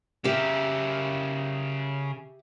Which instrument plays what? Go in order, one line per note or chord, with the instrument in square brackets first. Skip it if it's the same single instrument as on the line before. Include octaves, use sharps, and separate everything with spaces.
[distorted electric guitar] C#3 A#4 [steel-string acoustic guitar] G4 E5